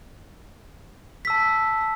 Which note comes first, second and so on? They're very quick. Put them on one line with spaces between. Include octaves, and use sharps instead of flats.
B6 E6 A5